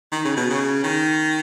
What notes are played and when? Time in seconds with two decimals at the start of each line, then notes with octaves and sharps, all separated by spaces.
0.12 D#3
0.25 C#3
0.37 B2
0.50 C#3
0.84 D#3